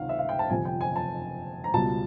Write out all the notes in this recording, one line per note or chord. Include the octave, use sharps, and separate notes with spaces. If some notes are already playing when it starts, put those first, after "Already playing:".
Already playing: C#2 C3 D#3 F5 F#5
E5
F5
G5
A5
G1 F2 C3 G#5
G5
G#5
A5
A#5
C#2 B2 G3 A5